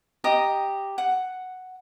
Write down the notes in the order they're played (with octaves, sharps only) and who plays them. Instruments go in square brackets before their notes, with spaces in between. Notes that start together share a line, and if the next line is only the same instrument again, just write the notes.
[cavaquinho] G4 D#5 A#5 D#6
F#5